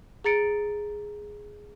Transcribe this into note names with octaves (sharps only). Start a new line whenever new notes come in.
G#4 A#5 A6 C#7 D7